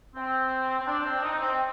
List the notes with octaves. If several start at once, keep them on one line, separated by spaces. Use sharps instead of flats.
C4
C4
D4
C4
D4
D#4
C4